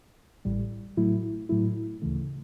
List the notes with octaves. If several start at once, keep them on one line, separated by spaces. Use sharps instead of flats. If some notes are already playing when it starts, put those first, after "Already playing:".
A1 A2 G3
A2 F#3 A3 E4
A2 F#3 A3 E4
D2 C#3 E3 A3